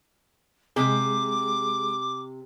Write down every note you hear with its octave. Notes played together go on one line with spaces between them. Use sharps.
C3 G#3 G#4 D6